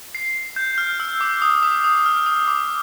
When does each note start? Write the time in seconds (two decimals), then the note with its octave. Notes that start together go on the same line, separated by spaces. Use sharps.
0.15 C7
0.56 G6
0.78 F6
1.00 E6
1.21 D6
1.42 D#6
1.63 D6
1.84 D#6
2.06 F6
2.26 D#6
2.48 D6